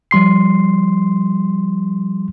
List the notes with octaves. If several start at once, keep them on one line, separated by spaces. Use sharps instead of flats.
F3 G3 C6 C7